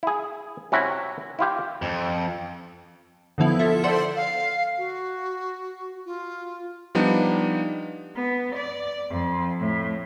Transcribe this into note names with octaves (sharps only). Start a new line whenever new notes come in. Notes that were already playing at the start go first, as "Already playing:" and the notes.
E4 G#4
C3 C#4 E4 F#4
E4 F4 G4
F2
D3 F3 B3 E4
F4 A4 E5
A4 C5 D5 F#5 C6
F5
F#4
F4
F3 G3 B3 D4 D#4
B3
D5
F2
A2